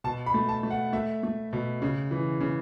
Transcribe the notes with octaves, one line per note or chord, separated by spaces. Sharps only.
B2 A5
B5
A3
A5
A3
F#5
A3 E5
A3
B2
C#3
E3
C#3